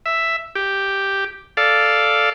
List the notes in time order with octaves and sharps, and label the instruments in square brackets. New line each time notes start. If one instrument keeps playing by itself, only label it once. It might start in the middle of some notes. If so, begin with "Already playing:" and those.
[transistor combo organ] E5
G4
A4 D5 F5